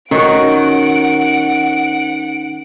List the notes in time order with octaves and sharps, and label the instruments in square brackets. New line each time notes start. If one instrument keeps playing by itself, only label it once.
[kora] D#3 F#4 [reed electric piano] C#4 [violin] F#5 D7